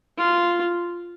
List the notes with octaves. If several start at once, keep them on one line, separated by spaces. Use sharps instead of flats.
F4